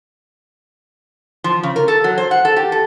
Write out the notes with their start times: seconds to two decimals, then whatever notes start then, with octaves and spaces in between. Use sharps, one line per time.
1.44 F3
1.63 C#3
1.76 A#4
1.88 A4
2.04 F#3
2.18 C5
2.31 F#5
2.45 A4
2.56 G4
2.72 A4